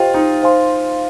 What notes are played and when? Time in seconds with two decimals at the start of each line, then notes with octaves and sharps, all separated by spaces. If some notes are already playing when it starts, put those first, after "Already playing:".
Already playing: F4 G4 C5 D#5 G5
0.14 D#4
0.43 C5 F5 G#5 C6